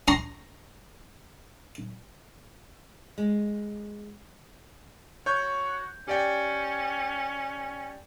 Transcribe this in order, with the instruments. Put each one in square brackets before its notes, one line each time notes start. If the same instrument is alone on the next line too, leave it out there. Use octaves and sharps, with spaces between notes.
[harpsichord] A#5 C6
[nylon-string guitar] G#3
[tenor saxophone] F#4 [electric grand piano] C#5 C#6 G6
[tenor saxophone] C#4 [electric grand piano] G4 D5 G5